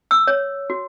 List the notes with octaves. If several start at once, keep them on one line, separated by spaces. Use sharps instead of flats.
E6
C#5
F#4